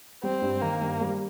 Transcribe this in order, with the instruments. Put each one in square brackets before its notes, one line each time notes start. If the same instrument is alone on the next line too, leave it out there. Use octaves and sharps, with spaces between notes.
[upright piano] G3 [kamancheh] C4
[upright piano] G2
[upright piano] D#3 [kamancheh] A#3
[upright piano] G2
G3